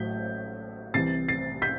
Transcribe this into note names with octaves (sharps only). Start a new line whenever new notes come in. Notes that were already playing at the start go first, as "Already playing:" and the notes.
Already playing: A1 A2 F#3 G6 B6
C2 C3 E3 A6 C7
A6 C7
G6 B6